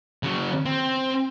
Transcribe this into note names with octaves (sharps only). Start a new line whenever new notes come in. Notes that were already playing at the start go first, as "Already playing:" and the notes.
C#3 F#3
C4